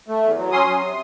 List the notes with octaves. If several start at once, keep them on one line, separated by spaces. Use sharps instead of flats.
A3
E2
F#3
C#4 C6 D#6
F#3
C3